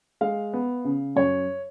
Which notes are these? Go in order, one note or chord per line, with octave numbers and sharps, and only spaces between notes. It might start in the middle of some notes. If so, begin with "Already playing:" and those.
G#3 F5
B3
C#3
F#2 C#5